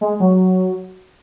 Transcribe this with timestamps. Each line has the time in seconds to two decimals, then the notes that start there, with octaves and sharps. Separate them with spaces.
0.01 G#3
0.20 F#3